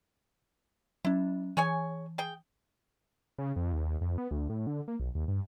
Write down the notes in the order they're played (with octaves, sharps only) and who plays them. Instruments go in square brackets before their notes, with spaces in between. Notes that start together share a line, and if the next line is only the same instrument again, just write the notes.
[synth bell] F#3 C#4 [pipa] E4
[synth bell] E3 [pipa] G#4 C#5 G#5
[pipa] G#4 G5
[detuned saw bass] C#3
F2
D#2
F2
B3
D2
A2
D3
A#3
B1
D#2
G2